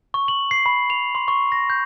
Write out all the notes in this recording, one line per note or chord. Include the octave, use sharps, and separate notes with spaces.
C#6
F#7
C7
B5
F7
C6
C#6
A#6
G6